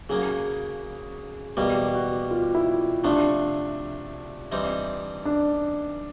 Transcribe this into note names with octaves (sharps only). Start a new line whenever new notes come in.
C#3 F#3 A#3 G#4
E2 B2 G3 A#3 G4
F#4
F4
E4
C3 F3 A3 D4
E3 G3 C4 D#4
D4